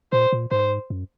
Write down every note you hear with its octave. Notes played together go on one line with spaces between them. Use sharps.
A#2 C5
A#2
G#2 C5
F#2